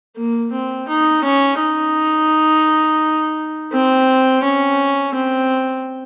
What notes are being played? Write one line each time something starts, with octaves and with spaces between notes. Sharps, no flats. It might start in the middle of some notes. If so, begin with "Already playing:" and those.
A#3
C4
D#4
C#4
D#4
C4
C#4
C4